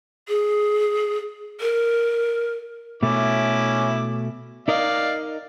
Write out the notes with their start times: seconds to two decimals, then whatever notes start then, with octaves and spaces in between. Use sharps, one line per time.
0.28 G#4
1.61 A#4
3.03 B2 A3 C#4 E4 D6
4.68 D#4 A#4 D5 D#5 F5